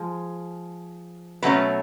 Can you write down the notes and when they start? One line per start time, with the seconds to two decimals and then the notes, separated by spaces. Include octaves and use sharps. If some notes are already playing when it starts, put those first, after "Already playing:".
Already playing: F3 G#3
1.42 B2 F#3 A3 C#4 B4